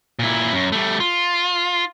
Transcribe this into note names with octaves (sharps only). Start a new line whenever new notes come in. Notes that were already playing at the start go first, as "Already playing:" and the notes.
A#2 E4
F#2
G3 A3
F4